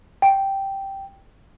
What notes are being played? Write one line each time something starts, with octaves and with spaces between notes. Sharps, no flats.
G5